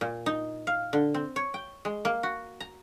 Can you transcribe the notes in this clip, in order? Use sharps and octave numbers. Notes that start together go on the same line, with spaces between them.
A#2
D#4
F5
D3
C4
C#5
G5
G#3
A#3
F#4
A#5